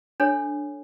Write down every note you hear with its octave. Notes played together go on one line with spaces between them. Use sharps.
D4 A4 C#5